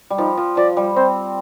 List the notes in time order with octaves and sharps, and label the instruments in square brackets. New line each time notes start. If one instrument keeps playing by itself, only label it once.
[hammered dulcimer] G3
[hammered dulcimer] F3 [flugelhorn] D#4
[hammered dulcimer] F3
[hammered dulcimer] F3 [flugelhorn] D5
[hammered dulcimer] G3
[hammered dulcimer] C4 [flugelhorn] C5